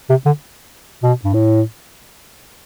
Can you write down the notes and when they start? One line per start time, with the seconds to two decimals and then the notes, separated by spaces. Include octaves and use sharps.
0.10 C3
0.26 D3
1.03 B2
1.24 G2
1.33 A2